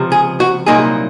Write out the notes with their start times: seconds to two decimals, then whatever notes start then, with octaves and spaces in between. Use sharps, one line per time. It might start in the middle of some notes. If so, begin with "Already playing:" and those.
Already playing: C#2 C3 F3
0.12 G#4
0.40 F#4
0.66 C2 A#2 F#3 A#3 D#4 G#4